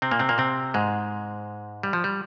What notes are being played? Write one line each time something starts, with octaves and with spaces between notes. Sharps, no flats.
C3 C4
A#2 A#3
C3 C4
A#2 A#3
C3 C4
G#2 G#3
G3
F3
G3